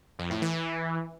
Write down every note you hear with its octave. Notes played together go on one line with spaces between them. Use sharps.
F2
A2
E3